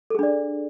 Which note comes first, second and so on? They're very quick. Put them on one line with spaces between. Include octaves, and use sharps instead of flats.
A4 G#4 D4 D5